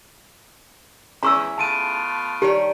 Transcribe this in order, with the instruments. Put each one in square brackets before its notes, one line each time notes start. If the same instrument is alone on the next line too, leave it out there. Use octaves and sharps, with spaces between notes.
[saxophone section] E2 [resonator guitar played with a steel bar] C#4 E4 G#4 [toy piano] A#5 C#6 E6
[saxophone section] A3 B3 F4 [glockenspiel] A5 D7 D#7
[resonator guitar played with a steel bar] D#3 G3 C#5 [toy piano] G4